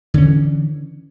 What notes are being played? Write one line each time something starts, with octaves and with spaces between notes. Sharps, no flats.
D3 E3 C#4